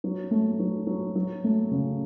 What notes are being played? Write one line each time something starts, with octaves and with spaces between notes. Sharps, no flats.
F#3
A3
F#3
F#3
F#3
A3
C#3